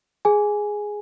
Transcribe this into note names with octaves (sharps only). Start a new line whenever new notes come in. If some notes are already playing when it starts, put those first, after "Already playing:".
G#4 G#5